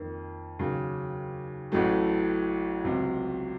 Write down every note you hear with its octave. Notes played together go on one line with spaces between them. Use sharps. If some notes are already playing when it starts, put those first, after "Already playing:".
Already playing: F2 D#3 A#3
D#2 C#3 F#3
A1 A2 F#3 A3
C#2 C3 F#3